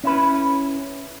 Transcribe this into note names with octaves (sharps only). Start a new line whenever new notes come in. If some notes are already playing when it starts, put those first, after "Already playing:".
C#4 E4 B4